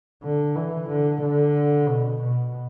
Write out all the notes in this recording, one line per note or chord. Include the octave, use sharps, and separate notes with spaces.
D3
E3
D3
D3
B2
B2